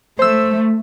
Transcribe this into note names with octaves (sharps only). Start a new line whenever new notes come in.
A3 C5 E6